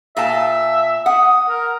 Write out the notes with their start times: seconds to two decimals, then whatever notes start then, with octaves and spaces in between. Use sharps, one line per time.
0.17 A#2 E5 F5 A5
1.06 F#5 D#6
1.49 A#4